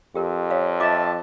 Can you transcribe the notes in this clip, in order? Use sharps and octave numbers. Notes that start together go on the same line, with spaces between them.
F2 G4 A#4
C#5 F5
F4 D#5 E5 A5 D6